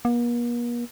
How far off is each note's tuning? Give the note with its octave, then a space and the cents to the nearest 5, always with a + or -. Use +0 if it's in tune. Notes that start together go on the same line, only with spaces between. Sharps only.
A#3 +45